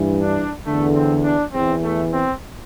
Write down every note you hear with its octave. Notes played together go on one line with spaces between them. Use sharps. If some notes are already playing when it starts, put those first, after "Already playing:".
Already playing: G2 E3
D4
E2 D3 A3
C4
D4
E2 E3 C4
A3
C4